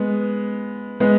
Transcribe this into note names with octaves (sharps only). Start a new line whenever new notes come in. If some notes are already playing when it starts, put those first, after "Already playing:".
Already playing: G#3 B3
G#3 B3